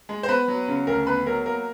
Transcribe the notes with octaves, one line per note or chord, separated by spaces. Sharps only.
G#3
C5
B3 B4
F#3
C#3
D2 A#4
B3 B4
F#3 A#4
A#3 A#4